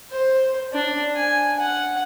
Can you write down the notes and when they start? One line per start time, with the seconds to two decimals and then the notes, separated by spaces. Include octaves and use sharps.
0.11 C5
0.73 D4
1.16 G#5
1.59 F#5